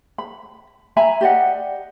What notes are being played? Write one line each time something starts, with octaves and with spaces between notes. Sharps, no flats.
B5
E5 G#5 A#5 B5
G4 D5 D#5 F#5